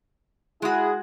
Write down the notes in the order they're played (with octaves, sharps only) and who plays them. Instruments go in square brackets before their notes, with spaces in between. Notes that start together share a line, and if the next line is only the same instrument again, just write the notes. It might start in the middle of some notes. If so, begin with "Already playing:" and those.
[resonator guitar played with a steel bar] G#3 F#4 [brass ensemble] E4 G#4